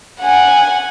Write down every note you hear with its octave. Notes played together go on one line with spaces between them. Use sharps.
F#5 G#5